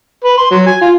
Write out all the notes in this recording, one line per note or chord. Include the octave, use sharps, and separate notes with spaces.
B4
C6
F#3
G#5
F4